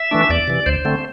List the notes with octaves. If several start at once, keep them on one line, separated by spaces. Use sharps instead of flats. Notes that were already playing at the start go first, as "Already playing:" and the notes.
Already playing: E5
E3 A3 D4
E2 D5
C3 E3
D2 C5
D3 A3 C4